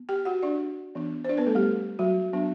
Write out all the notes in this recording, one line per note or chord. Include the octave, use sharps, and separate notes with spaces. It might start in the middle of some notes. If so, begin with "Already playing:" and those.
Already playing: B3
G4 G5
F#4 F#5
D4 D5
E3 B3 D4
C5
D4 D5
B3 B4
A3 A4
G3 G4
F#3 F#4
F#3 B3 D4